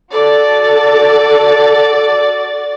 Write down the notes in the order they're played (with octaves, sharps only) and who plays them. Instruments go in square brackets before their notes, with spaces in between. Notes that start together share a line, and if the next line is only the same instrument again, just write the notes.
[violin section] F#4 D5 A6 [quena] A4